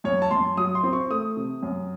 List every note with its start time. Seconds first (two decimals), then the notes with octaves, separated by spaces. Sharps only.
0.04 F#2 C#5
0.22 A5
0.31 F#2 C6
0.57 F#3 D#6
0.75 C6
0.83 C4
0.93 C#6
1.10 A3 D#6
1.37 C3
1.62 F#2